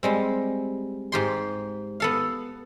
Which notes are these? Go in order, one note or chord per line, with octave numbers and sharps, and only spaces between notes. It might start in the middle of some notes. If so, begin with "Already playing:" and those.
G3 G#3 C4
G#2 G4 C6
B3 A4 F5